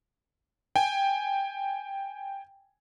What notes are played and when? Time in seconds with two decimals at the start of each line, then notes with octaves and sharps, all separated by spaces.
0.76 G5 G#5